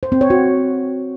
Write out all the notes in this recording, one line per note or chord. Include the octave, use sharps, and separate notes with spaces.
C5
C4
C#5
F#4